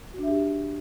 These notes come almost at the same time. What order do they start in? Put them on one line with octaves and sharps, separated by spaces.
F#4 D4 E5 G4